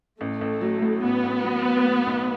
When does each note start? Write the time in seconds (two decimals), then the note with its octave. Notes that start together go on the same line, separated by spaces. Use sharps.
0.20 A1 A3
0.41 A1
0.61 F#3
0.82 A2
1.03 A1 B3
1.24 A1
1.44 F#3
1.65 F#3
1.85 A2
2.06 B1